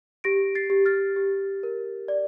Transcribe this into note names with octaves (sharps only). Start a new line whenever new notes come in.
G4 A#6 D7
A6 C7
G4
F6 A6
G4
A#4
D5